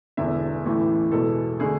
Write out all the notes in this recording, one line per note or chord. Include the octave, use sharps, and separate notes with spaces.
E1 E2 D3 E5
A1 A2 E3 A3
E2 B2 G#3 A4
D3 A3 G#4